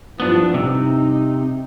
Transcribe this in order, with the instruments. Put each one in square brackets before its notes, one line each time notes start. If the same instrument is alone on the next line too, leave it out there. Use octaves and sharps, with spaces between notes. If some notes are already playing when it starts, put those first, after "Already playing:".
[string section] G2 E3 F3 [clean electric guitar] B3 D4
[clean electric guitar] C3 [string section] D#4